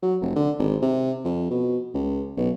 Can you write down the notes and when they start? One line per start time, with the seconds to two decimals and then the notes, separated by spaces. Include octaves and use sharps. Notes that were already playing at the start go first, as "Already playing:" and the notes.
0.03 F#3
0.21 F1
0.36 D3
0.59 G#1
0.82 C3
1.25 F2
1.50 B2
1.94 C#2
2.37 B1